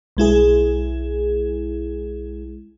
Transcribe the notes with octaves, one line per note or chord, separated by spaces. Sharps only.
B1 G#3 E4 G#4